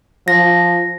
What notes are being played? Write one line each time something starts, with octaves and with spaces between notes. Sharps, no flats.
F3 A#6